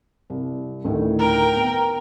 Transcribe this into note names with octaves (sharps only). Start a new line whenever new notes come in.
C2
D2 A2 D#3
A#4 G5 A#5
B3